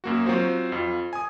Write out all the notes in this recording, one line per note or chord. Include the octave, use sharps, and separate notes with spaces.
F#2 A#3 F#4
F#3 C4 F4 F#4 C5
F2 F4
G#5 D#6